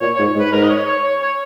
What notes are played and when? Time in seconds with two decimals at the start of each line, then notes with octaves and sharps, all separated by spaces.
0.01 A#2 C#5
0.15 C#5
0.19 G#2
0.35 G#2
0.39 B4
0.52 G#2 A#4
0.63 D#5
0.69 C#5
0.86 C#5
1.03 C#5
1.20 C#5